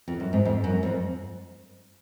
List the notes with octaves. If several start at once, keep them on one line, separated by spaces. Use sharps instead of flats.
F2
F#2
G#2
F2
F#2
F2